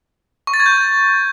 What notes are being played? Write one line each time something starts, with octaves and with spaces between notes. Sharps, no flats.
C#6
A6
G#6
G6